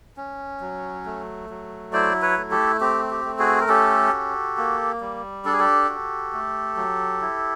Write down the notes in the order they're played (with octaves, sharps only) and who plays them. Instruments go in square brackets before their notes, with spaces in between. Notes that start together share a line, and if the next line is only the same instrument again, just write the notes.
[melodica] C#4
F#3
A3
F#3
E4 C5 D5
B4 C#5
A3
G4 A4
C4 G4
G4
A3
F#4 G#4
A#4
C#4 G4 A4
F#4
A#3
G3
D4 A4
G#4
G4 A4
F#4
A3
F#3
E4